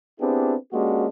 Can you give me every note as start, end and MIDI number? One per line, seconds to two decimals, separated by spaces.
0.20 0.54 59
0.20 0.54 60
0.20 0.54 62
0.20 0.54 64
0.20 0.54 67
0.20 0.54 68
0.72 1.06 56
0.72 1.06 58
0.72 1.06 61
0.72 1.06 62
0.72 1.06 66
0.72 1.06 67